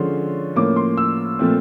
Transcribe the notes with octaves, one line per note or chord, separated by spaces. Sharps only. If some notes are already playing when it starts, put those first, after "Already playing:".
Already playing: D3 F3 G#3 C#4 C6
A2 F3 A#3 C#4 D6
C6
E6
A#2 F3 A3 C4